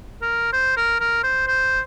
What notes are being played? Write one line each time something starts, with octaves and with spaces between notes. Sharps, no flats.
A#4
C5
A#4
A#4
C5
C5